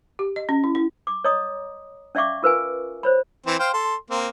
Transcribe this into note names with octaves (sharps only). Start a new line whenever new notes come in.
G4
D#5
C#4
E4
E4
D6
C#5 D#5 A#5 D#6
C#4 D5 E5 F5 C#6 D6
F4 A#4 B4 F5 G#5
C5 C#5 B5
E3 C4
C5 F5 G5
A4 C6
A#3 C4